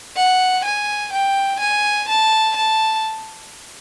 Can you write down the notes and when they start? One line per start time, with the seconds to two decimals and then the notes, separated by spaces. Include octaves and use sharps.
0.17 F#5
0.65 G#5
1.13 G5
1.61 G#5
2.09 A5
2.56 A5